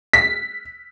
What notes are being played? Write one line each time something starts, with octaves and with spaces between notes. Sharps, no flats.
B6